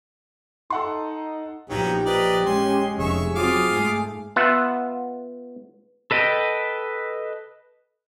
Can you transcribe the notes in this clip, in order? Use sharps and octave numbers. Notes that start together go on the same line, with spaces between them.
D#4 A4 F#5 C6
A#1 F3 F#3 B3 C#4 D#4 G4
A#4 B4 D5 D#5
G#3 C#4 G#5 C6
F1 G#4 C#5 E5 C#6
F#3 C4 F4 F5 D6 D#6
G#2 A3
B3 F4 E5 F#5
A4 B4 D#5 G5